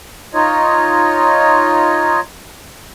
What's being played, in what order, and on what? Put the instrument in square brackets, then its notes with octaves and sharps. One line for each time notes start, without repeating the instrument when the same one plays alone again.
[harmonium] D#4 F4 C#5 D#5